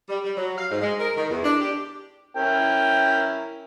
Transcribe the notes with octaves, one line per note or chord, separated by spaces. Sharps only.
G3
G3
F#3
F5
G#2
G#3
A#4
D#3
E2
D4
G4
C#4 E4 A#4 G5